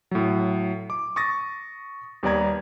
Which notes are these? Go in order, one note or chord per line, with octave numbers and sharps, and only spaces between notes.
A2 F#3
D6
C#6 D#6 A6 A#6
D#2 G3 B3 D5 A#5 G#6